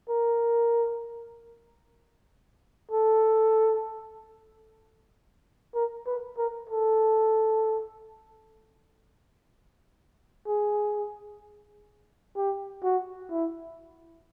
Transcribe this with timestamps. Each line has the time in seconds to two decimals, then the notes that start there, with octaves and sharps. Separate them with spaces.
0.09 A#4
2.91 A4
5.75 A#4
6.06 B4
6.38 A#4
6.69 A4
10.47 G#4
12.36 G4
12.83 F#4
13.31 E4